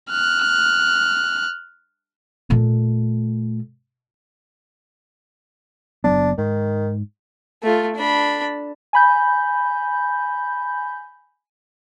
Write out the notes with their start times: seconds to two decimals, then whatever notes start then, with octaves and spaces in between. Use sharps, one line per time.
0.11 F6 F#6
2.50 A#2 A3
6.04 F#1 F#3 B3 D4
6.38 G#2 D#3
7.63 A3 F4
7.96 D4 B5
8.93 G#5 B5 G6